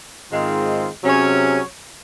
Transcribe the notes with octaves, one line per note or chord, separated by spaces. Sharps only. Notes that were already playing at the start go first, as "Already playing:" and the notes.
G#2 D#3 G#3 C4 F4
C3 F#3 C#4 G#4 C#5